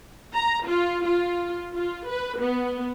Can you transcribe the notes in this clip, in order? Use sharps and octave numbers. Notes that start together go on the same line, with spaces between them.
A#5
F4
F4
F4
B4
B3